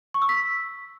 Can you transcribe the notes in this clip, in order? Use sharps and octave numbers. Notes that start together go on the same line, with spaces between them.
C#6
E6
B6